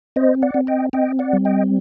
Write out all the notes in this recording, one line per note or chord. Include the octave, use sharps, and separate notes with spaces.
C4 C5 D#5
D5 F#5
C4
D#5 G5
C4 D#5 G5
D5 F#5
G3
D#5 G5